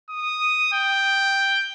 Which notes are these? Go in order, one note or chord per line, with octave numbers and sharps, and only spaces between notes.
D#6
G5